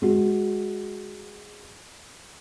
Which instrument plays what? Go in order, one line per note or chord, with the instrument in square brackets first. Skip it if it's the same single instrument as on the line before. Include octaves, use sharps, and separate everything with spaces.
[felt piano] G#3 F#4